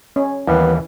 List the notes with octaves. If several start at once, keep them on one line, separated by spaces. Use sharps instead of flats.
C#4
D#2 E3 G3 B3